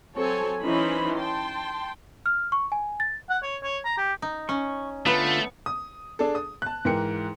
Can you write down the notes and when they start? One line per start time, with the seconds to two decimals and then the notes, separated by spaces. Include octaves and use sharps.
0.15 F#3 C4 A4 C#5 G#5
0.63 E3 C#4 D#4 E4 C5 B5
1.17 G5 A5 C6
2.26 F6
2.52 C#6
2.72 G#5
3.00 A6
3.29 F#5
3.43 C#5
3.63 C#5
3.85 A#5
3.98 G4
4.22 D#4
4.49 C#4 C#6
5.06 D3 A3 B3 F4 B4 F5
5.66 D#6
6.19 D4 G#4 A4
6.35 D#6
6.62 A5 F#6
6.85 G#2 E3 A#4 G5 C#7